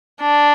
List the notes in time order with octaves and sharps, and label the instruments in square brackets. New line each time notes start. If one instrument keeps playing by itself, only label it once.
[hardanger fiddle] D4